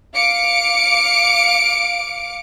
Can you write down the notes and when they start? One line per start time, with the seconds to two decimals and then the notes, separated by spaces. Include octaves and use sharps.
0.15 F5 D6 C#7 D7